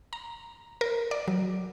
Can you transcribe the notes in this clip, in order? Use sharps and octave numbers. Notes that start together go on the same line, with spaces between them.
A#5
A#4
D5
F#3